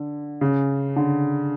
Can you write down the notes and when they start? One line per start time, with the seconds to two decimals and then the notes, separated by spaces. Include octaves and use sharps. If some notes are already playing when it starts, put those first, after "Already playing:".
Already playing: D3
0.41 C#3
0.96 D3